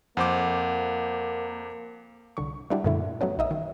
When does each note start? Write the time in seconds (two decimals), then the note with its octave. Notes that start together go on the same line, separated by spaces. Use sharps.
0.17 F2 A#3 C5 F#5 D6
2.37 C2 D3 C#6
2.70 G3 G#3 D4 E4 F#4 G4
2.84 F#2 A#2 D3 A3 E4
3.21 F#3 A3 B3 C#4
3.38 A#1 D#4 D#5 E5
3.51 D#3